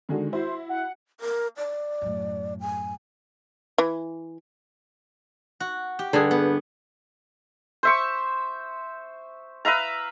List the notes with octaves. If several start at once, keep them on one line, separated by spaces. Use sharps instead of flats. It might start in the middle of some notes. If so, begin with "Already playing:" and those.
D3 D#3 G#3 F#4
E4 F#4 C5
F#5
A#4
D5
F#2 A2
G#5
E3
F#4
G4
G2 D3 G#4
B3
C5 E5 C#6
B4 E5 F5 A#5